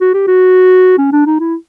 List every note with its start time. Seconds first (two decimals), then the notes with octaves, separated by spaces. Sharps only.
0.01 F#4
0.14 G4
0.27 F#4
0.98 C#4
1.13 D4
1.26 D#4
1.40 E4